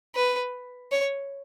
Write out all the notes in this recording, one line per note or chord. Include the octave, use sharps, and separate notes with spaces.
B4
C#5